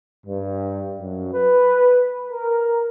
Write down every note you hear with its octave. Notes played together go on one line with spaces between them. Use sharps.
G2
F#2
B4
A#4